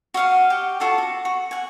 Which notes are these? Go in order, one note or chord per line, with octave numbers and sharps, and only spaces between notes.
F#4 D#5 F5 F#5
G4
F4 F#4 A4 A5
F#4
F#4
F#5 G#5